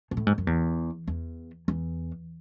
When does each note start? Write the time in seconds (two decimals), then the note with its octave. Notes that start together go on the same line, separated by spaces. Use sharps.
0.11 A#2
0.17 A2
0.27 G#2
0.38 F#2
0.47 E2
1.08 E2
1.68 E2